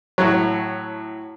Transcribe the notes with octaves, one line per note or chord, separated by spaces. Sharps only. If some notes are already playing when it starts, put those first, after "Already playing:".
A2 F#3